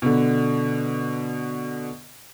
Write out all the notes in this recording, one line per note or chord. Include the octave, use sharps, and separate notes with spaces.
B2 D3